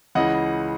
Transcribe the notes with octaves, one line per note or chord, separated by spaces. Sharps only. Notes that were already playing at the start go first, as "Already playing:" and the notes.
C#2 C#3 E3 D#5 F#5